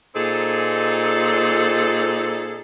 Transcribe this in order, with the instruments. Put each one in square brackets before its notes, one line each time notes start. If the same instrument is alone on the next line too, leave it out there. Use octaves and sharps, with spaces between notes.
[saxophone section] A#2 C4 D#4 G#4 A4